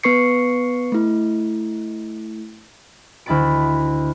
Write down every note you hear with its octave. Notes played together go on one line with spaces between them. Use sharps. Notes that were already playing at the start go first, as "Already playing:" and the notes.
B3 B4 C#6 C7 C#7
A3 E4
D2 E4 D#5 B5 A6 D7